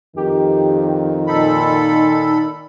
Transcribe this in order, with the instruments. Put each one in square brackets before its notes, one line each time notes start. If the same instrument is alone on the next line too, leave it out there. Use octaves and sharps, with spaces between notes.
[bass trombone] F2 [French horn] D#3 [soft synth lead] G4
[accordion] A#2 A4 B5 [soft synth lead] D#4